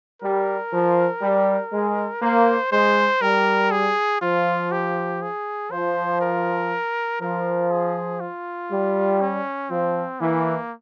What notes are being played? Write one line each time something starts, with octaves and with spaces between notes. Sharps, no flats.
G3 A#4
F3
G3
G#3
A#3 C5
G#3 C5
G3 A#4
G#4
F3 F4
G4
G#4
F3 C5
A#4
F3 A#4
G#4
F4
G3
C#4
F3 C4
E3 A#3